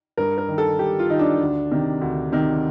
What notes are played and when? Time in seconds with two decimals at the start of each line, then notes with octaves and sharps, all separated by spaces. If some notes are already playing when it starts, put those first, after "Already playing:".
0.17 G2 A#4
0.38 A#4
0.48 D#3
0.58 A4
0.79 G2 G4
0.99 F4
1.10 D#3 D#4
1.19 D4
1.41 D2
1.71 C3 D#3
2.01 D2
2.32 C3 D#3